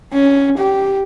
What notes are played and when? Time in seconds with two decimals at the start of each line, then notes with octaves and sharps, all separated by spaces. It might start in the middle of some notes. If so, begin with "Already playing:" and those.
0.12 C#4
0.57 G4